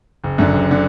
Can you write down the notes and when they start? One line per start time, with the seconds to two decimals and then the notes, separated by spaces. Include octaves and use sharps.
0.24 F#1
0.38 F#2 D3
0.53 F#1
0.71 D3